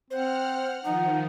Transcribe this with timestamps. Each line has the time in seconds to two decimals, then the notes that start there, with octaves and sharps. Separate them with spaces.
0.11 C4 C5 F#5 F6
0.84 D#3 F3 D#4 F#5